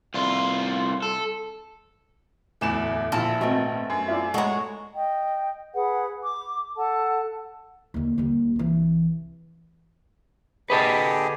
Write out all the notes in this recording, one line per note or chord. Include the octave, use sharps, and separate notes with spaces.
C2 F4
A4
D1 E2 A3 E4 E7
A#1 F3 E4 A4 F5
G#1 A3 B3 C4
F#2
E4 F4 D5
G#3 F#4 A4 C#5 D#5 F#5 A#5
D#5 G5
G#4 B4 F#5
D6
A4 F#5 A5
D#2 D3
D#2 G3
C2 E3
D3 G4 G#4 B4 D#5 A5